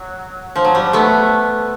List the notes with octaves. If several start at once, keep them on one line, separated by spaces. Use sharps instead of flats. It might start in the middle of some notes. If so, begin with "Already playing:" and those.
Already playing: F#3
F3
F#3
G3
A3 B3